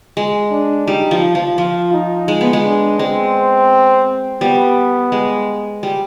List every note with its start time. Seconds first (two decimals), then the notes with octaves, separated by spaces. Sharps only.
0.17 G#3
0.51 D4
0.87 G3 D#4
1.11 F3
1.35 F3
1.58 F3 F4
1.93 D#4
2.28 G#3
2.41 B3
2.53 G#3
2.64 D4
2.99 G#3 C4
4.41 G3 B3
5.12 G#3
5.83 G3